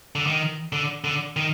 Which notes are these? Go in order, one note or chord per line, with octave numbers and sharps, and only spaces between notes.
D3
D#3
D3
D3
D#3